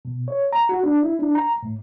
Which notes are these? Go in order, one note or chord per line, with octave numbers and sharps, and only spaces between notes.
B2
C#5
A#5
F#4
D4
E4
D4
A#5
A2